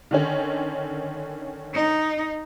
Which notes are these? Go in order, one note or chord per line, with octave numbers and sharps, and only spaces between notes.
D3 D#3 C#4
D#4